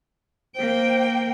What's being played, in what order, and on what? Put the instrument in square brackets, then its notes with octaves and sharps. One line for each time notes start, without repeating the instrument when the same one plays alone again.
[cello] A#3 G5 [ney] C5